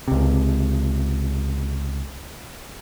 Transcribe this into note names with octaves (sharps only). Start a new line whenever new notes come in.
C#2 C3